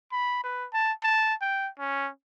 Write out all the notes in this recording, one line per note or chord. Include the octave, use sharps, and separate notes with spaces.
B5
B4
A5
A5
G5
C#4